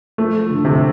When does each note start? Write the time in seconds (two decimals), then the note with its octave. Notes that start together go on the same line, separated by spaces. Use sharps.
0.18 F3 A3
0.50 D3
0.65 C3